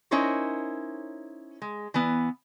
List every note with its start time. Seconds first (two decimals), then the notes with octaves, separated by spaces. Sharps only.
0.11 C#4 D#4 E4 A#4 C5 C#5
1.62 G#3
1.94 E3 B3